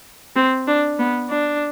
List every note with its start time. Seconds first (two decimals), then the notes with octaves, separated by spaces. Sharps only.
0.36 C4
0.68 D4
0.99 B3
1.30 D4